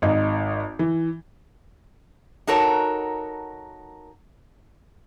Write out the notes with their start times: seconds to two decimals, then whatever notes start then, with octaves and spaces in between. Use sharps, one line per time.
0.02 G#1 D#4
0.79 E3
2.47 D#4 F#4 A4 A#4 C#5